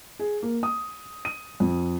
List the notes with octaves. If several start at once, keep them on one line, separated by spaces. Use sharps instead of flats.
G#4
A#3
D#6
D#7
F2